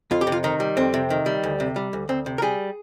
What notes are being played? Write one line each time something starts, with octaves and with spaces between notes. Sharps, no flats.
F2 F4
G4
C3
F4
D#3 D#4
G3
F2 C4
C3
D#3
G3
D2
C3
G3
D2
D2 C4
C3
A#4
G3 G#4